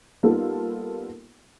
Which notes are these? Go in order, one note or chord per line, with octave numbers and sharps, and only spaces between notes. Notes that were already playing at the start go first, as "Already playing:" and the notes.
G3 A#3 B3 D#4 F4 A4